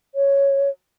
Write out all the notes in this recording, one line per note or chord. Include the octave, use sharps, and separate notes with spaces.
C#5